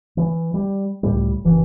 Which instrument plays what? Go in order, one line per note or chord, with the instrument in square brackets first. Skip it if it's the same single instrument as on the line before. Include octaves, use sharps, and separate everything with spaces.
[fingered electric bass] E3
G3
C#2 A2 G3
[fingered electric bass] F#1 [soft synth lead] E3